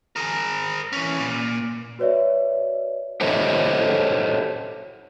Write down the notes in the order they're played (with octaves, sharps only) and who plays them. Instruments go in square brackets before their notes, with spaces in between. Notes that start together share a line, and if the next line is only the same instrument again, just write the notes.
[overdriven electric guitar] G#4 A#4
E3 C#4
A#2
[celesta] F#4 B4 C#5 D5 E5
[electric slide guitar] G4 A4 C5 C#5 D#5 E5